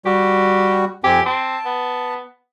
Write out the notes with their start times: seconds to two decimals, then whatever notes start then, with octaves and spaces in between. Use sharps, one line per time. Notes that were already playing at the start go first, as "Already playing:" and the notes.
0.06 G3 F#4 G4
1.04 F2 C4 G4 G#5
1.26 C4 A5
1.65 B3